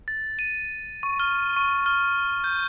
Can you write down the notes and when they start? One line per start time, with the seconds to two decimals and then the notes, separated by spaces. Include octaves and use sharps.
0.08 A6
0.39 D#7
1.03 C#6
1.20 F6
1.56 C#6
1.86 F6
2.44 G6